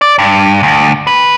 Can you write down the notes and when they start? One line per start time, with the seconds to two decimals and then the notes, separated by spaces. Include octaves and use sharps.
0.01 D5
0.19 G2
0.63 D2
1.07 B4